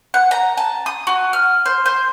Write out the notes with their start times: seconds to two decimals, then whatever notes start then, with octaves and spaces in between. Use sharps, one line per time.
0.14 F#5
0.31 A#5
0.57 A5
0.86 D#6
1.07 F#4
1.33 F6
1.66 C5
1.86 C5